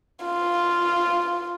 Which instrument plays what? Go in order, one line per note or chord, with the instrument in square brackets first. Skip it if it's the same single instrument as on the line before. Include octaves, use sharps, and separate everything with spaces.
[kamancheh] F4